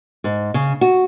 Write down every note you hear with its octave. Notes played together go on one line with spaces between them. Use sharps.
G#2
C#3
F#4